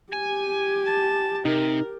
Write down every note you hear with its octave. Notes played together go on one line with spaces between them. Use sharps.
G4 G#5
A5
C3 D#4 A#4